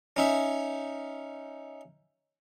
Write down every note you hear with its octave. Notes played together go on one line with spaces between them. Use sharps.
C#4 D#4 E5